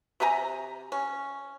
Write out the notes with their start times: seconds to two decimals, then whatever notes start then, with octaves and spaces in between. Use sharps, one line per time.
0.20 C3 G4 G#5 A#5
0.92 C#4